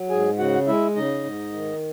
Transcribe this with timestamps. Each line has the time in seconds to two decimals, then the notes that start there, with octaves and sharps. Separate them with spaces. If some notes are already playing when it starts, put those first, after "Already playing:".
Already playing: F#3
0.10 G#2 G#4 G#5
0.38 C#3 F#4 F#5
0.67 G#3 E4 E5
0.96 C#3 D#4 D#5
1.24 G#2
1.53 D#3